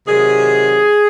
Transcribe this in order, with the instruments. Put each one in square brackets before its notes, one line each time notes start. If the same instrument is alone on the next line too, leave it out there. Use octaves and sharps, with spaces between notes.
[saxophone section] C3 D#3 F#3 G#4